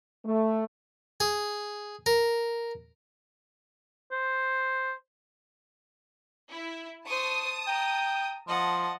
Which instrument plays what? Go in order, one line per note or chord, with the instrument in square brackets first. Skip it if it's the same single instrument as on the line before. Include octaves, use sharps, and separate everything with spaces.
[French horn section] A3
[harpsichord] G#4
A#4
[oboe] C5
[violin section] E4
[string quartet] C5 C#6 [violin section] A5 D#6
[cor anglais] G5 [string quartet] A#5
[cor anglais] F3 [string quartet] D#5 F#5 A5